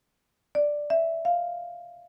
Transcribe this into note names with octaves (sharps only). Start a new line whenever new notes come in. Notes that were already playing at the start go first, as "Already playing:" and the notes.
D5
E5
F5